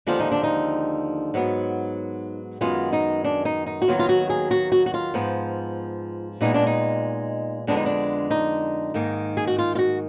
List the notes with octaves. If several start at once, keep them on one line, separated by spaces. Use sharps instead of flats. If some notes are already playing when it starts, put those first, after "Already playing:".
D#2 D3 F3 G#3 B3 F4
D#4
D4
D#4
G#2 F#3 B3
F#2 D#3 G#3 B3 F4
D#4
D4
D#4
D#4
F#4
D#2 D#3 F#3 B3 F4
F4
F#4
G#4
F#4
F#4
F#4
F4
G#2 F3 B3
A#2 G#3 B3 D#4
D4
D#4
F2 D3 G#3 B3 D4
D#4
D4
D#4
G#2 D#3 A#3
G#4
F#4
F4
F4
F#4